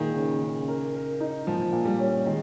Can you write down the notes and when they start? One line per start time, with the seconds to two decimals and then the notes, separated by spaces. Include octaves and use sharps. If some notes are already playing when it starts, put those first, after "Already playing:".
Already playing: A#2 D#3 G#3
0.16 C#3
0.42 C#3
0.68 A#4
0.95 A#4
1.20 D#4
1.47 A#2 F3
1.72 A#2
1.85 G3
1.99 C#4
2.26 D#3 G#3